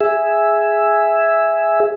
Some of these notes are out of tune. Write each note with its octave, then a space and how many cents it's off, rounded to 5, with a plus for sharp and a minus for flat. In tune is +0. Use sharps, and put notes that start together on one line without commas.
G#4 +0 E5 +0